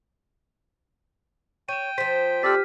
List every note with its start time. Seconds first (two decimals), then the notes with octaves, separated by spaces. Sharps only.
1.69 C#5 G5 D#7 E7
1.98 F3 C5 B6
2.43 C4 G4 A4 D5 F6 B6